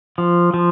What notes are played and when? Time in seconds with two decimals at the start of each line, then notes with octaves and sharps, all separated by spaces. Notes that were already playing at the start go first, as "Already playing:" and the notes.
0.18 F3
0.54 F3